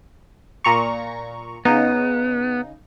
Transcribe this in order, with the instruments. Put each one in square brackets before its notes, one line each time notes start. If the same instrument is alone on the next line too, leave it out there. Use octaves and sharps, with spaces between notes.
[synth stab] A#2 A#5 C#6
[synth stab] C#3 D#4 [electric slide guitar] B3